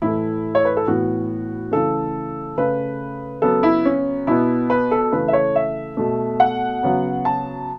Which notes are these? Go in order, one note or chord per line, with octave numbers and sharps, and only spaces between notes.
A2 E3 A3 E4
C#5
B4
A4
A2 E3 B3 F#4
C#3 E3 A3 A4
C#3 A3 B4
C#3 F#3 B3 A4
E4
C#4
B2 B3 E4
B4
A4
C#3 E3 A3 B4
E5
C#5
E5
B2 A3
F#5
C#3 F#3 B3
A5